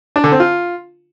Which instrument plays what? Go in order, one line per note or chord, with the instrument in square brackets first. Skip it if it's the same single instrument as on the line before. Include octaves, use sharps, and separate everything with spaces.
[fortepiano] D4
D3
C4
F4